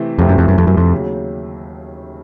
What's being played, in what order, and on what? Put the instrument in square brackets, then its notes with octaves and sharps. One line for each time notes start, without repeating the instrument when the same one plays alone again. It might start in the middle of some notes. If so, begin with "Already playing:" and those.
Already playing: [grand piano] C3 E3 A3 C4
[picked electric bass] F2 [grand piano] C3 E3 A3 C4
[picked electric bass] F#2
F2
F#2
F2
F#2
F2
[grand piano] D#2 C#3 F#3